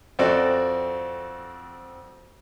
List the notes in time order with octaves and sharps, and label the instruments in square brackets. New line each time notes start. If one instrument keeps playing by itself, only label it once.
[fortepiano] F2 C4 F#4 A4 D5